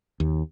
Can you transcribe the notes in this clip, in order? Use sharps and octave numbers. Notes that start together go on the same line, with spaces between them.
D#2